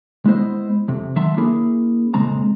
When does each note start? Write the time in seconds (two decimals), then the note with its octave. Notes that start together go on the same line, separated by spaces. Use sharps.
0.25 G#3 B3 E4 C5 D#5
0.88 F2 C3
1.16 D#3 F#3 E5 A5 A#5 C6
1.37 A#3 C#4 D4 E4 G#4 A#4
2.14 F2 A#2 C#3 G#3 C4 A#5